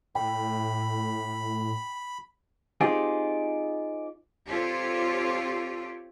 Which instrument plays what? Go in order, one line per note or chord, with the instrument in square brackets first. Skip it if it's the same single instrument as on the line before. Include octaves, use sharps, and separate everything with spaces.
[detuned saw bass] A2 [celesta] G5 [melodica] B5
[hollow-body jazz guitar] C4 D#4 F4 G4 G#4
[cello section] C4 F4 G4 A4 C#5 D5